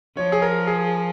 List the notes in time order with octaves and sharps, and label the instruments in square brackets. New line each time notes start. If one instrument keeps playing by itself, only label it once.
[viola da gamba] F3 [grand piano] C#5
[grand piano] G#4
A#4
G#4